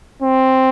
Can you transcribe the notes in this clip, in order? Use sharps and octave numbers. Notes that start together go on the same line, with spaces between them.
C4